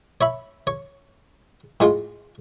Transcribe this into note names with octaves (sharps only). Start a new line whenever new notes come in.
C#5 E5 B5
C#5
A2 G#3 F4 C6